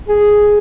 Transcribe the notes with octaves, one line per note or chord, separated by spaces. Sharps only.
G#4